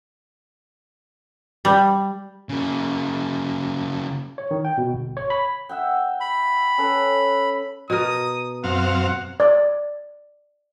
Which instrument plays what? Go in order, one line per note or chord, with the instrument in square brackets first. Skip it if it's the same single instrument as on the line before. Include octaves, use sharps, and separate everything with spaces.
[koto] G3
[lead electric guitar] C#3 A#3
[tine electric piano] C#5
D#3
G5
B2
G1
C#5
B5
[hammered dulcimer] E5 F#5 G5
[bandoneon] B5
[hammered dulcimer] C#4 A4 B4
[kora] B2 A#4 [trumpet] D#6
[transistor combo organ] F#2 C4 F5 [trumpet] F#5
[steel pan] D5